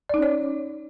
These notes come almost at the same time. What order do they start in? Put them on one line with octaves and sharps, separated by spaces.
D5 D#4 C#4 C#5